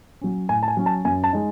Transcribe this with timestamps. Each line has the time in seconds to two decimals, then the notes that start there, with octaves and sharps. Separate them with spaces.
0.21 F#3 C#4
0.49 A2 G#5
0.63 A5
0.68 G#5
0.77 F#3 C#4
0.86 A5
1.05 F#2 G#5
1.24 A5
1.33 G#3 D#4